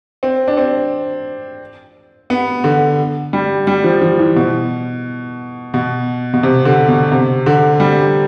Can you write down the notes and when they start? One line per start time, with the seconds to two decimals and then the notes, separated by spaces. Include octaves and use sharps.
0.23 C4
0.48 D4
0.57 C4
2.30 B3
2.64 D3
3.33 G3
3.67 G3
3.84 F3
4.02 F3
4.19 E3
4.36 B2
5.74 B2
6.34 B2
6.43 C3
6.65 D3
6.88 B2
7.12 C3
7.46 D3
7.80 G3